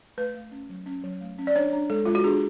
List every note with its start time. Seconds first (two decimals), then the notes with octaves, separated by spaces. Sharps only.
0.18 A3 B4
0.34 A3
0.52 C#4
0.70 F#3
0.86 C#4
1.04 F#3
1.21 A3
1.39 C#4
1.47 D5
1.55 D4 C#5
1.73 D4
1.90 G#3 A4
2.05 G#3 F4
2.15 F#4
2.24 D4 G#4